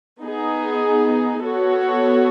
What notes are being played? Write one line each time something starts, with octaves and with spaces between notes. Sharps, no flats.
B3 D#4 G#4
B3 F#4 A4 C#5